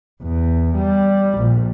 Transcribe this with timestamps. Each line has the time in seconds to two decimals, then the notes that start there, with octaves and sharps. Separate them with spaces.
0.22 E2
0.75 G3
1.38 A#1